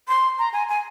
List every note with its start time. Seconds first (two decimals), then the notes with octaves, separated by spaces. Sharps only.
0.08 C6
0.39 A#5
0.53 G#5
0.69 G#5